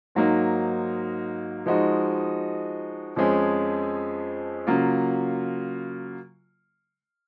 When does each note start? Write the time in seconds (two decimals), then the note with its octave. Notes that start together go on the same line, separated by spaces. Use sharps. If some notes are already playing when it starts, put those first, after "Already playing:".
0.15 G#2 F#3 A#3 D#4
1.66 F3 G#3 D#4 F#4
3.16 F2 F3 G#3 C#4 G#4
4.67 C#3 F#3 A#3 F4